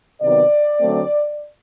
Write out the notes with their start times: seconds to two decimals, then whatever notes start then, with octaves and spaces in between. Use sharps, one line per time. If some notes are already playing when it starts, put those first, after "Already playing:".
0.22 C3 D#3 F#3 B3 D5
0.81 D3 F#3 A3 C4